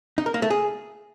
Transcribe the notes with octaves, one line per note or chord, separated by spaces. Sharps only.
D#4
A#4
A#3
A3
G#4